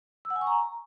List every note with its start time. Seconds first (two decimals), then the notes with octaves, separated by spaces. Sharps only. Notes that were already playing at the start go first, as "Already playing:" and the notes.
0.25 E6
0.30 F#5
0.36 G#5
0.41 C#6
0.47 A#5